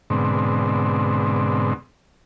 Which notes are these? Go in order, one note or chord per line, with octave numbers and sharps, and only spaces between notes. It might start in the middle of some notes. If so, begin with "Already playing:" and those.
G#2 B2 D3 C4